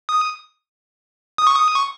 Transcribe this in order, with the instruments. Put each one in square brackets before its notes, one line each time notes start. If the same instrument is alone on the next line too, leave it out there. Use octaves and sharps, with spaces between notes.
[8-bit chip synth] D#6
D#6
C#6
D#6
C#6